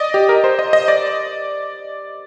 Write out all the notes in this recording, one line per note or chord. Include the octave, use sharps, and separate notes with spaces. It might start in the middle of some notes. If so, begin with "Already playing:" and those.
Already playing: D5 D#5
G4
A#4
C5
D#5
D#5
D5